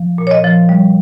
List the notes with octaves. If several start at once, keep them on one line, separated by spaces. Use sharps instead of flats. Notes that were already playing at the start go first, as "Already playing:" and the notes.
Already playing: F3
A#2
C#5
D#5
F3
G3